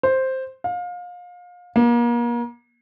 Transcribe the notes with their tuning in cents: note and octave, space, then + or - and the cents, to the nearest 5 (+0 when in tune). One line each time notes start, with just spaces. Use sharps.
C5 +5
F5 +30
A#3 +35